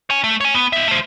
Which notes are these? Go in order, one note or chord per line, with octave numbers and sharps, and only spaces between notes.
C#5 G#5
A3
C#5 G#5
B3
D#4 E5
A3 C5